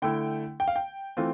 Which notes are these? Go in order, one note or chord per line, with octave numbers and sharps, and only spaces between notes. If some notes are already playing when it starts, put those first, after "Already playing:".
D3 A3 E4 G5
G5
F5
G5
E3 A3 C4 F4